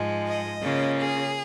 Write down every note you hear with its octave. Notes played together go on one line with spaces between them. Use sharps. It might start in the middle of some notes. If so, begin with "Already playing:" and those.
Already playing: G#2 F3 G#3
D#5
C#3 A#3 C#4 F4
G#4